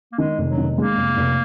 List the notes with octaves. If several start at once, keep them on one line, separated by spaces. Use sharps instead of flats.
A#3
D#3 G#3
F1
F#3
D#3
G#3 A#3
F1
F1